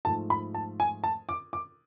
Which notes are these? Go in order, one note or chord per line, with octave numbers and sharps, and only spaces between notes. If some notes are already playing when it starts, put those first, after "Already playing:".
G#2 F3 A3 A5
B5
A5
G#5
A5
D6
D6